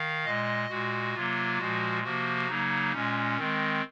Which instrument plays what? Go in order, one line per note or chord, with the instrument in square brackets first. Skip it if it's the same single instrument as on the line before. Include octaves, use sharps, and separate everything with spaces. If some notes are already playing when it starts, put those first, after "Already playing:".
Already playing: [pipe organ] D#3 F5
A#2 G#3 D#5
A#2 G#3 F#4
C3 F#3 A#3 F4
A#2 F3 G#3 F#4
C3 F3 A#3 F#4
C#3 F#3 A#3 D#4
A#2 G#3 C#4
D#3 G#3 C4